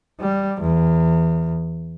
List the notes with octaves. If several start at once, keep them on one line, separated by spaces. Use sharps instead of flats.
G3
E2